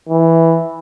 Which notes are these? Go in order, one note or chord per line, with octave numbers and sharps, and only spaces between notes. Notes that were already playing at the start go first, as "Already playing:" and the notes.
E3